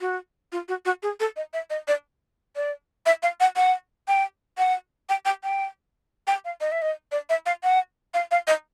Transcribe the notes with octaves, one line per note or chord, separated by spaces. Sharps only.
F#4
F4
F#4
F#4
G#4
A4
D#5
E5
D#5
D5
D5
E5
F5
F#5
F#5
G5
F#5
G5
G5
G5
G5
F5
D#5
E5
D#5
D5
E5
F5
F#5
F5
F5
D#5